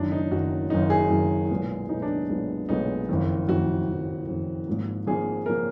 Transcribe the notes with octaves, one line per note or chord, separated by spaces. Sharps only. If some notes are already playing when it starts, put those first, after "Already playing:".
Already playing: F#1 F#2 D#3 D4
D#4
F#1 F#2 D#3 F#4
F#1 F#2 D#3 D#4
G#4
F#1 F#2 D#3
B1 A#2 G#3 B3
B1 A#2 G#3 B3 D#4
D4
B1 A#2 G#3 B3
B1 A#2 G#3 B3 D#4
F#1 F2 D#3
F#1 F2 D#3 F#4
F#1 F2 D#3
F#1 F2 D#3
G#1 G#2 F3 A#3
G#1 G#2 F3 A#3 G#4
F3 A#3 A#4